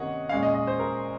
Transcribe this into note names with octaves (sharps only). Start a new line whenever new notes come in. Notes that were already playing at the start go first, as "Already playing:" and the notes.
Already playing: C3 D#3 A#3 C#4 C#5 D#5 F#5
A#2 G#3 C#4 F5
D#5
D#5
C5
A#4